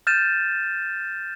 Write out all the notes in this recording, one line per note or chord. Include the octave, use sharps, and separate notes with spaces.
F6 G6 A6 D#7 E7